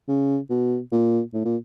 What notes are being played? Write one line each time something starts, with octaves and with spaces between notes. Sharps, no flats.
C#3
B2
A#2
A2
A#2